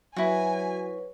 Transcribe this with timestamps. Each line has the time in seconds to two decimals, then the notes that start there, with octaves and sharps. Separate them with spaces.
0.16 F#3 E4 F#4 B4 C#5 G#5